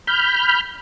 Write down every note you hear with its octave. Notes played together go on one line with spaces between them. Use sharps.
B5 F6 G6